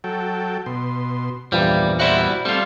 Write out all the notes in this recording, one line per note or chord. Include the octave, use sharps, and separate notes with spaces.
F#3 A4 G5
B2 C6
E2 G2 A#2 E3 F3 G3
G3 E4 F#4 C5 D5 E5
G3 A3 C4 F4 E6